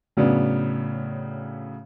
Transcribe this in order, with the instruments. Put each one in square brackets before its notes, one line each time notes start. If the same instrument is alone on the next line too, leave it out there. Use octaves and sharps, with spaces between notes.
[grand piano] A2 C#3 F#3 B3 D4